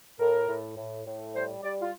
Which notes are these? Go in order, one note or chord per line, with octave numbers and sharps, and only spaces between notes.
A2 A#4
A2
A2
A2
G3 C5
G3 D5
F4